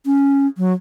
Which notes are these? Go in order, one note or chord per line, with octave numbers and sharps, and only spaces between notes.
C#4
F#3